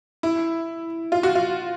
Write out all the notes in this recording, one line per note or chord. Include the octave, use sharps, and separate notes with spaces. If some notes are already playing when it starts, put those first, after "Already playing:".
E4
F4
F#4
F4